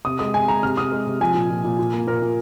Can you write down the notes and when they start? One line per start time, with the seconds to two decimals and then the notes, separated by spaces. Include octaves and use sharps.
0.05 C3 D#6
0.19 G#3 D#6
0.34 C3 G#5
0.48 G#3 A#5
0.63 C3 F6
0.77 C3 D#6
0.92 G#3
1.07 C3
1.21 F3 G#5
1.34 A#2
1.50 A#2
1.64 A#2
1.79 A#2
1.93 A#3
2.07 A#2 A#4
2.22 A#2